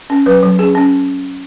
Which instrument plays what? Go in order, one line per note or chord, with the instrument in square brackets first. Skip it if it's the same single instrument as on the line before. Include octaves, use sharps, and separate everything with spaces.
[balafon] C#4
F#3 B4
F#3
C#4 G#4
C#4